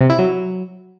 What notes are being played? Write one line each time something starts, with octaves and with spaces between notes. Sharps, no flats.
C3
E4
F#3